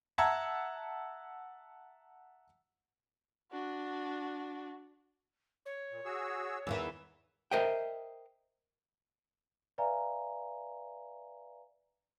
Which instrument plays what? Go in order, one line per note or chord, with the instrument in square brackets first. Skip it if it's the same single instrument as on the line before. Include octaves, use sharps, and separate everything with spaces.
[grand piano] E5 F#5 A5 A#5 E6 G#6
[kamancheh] D4 F#4
[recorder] C#5
[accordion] A#2
F#4 G#4 E6
[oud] E2 D#3 E3 [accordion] E6
[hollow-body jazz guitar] A#4 C5 D#5 E5 G5
[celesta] B4 D5 E5 F5 G#5 A#5